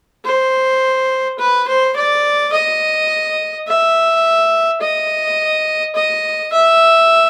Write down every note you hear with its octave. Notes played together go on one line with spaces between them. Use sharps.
C5
B4
C5
D5
D#5
E5
D#5
D#5
E5